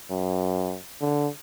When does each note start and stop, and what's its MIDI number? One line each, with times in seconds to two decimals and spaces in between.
0.10 0.76 42
1.01 1.28 50